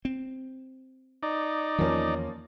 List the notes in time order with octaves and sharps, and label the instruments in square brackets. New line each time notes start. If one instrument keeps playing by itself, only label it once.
[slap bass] C4
[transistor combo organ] D#4 D5
[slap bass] E2 D#3 [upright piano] F3 A#3 C#4